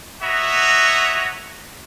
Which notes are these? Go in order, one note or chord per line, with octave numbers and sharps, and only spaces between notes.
B3 F#4 C#5 D#5 E5 A#5